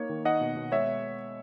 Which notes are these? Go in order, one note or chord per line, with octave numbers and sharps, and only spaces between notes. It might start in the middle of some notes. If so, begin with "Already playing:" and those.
Already playing: A#3 D#4 C#5
D#3
D#4 D#5 F#5
B2
B2
G#3 C#5 E5